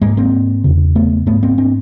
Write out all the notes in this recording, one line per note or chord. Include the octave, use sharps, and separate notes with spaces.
G#2 G#3 A#3
A#3 C4
E2 C#3
A3 B3
G#2 A3 B3
A#3 C4
C4 D4